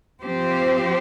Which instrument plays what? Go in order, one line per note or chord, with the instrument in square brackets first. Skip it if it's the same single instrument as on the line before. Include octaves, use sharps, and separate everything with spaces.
[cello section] F3 C4 G4 C5